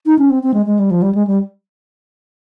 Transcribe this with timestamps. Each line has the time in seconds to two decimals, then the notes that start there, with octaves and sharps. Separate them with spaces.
0.06 D#4
0.18 C#4
0.30 C4
0.43 C4
0.54 G#3
0.66 G#3
0.79 G3
0.91 F3
1.02 G3
1.15 G#3
1.27 G3